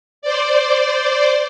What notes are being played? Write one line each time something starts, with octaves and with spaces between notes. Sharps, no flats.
C5 D5